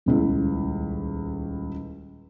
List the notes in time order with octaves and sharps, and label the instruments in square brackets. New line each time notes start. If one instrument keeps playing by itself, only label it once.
[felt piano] D#1 C#2 E4